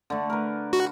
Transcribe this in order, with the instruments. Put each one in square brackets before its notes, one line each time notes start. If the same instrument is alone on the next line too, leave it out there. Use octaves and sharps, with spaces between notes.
[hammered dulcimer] D3 A3
A#4 B4
[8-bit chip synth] F#4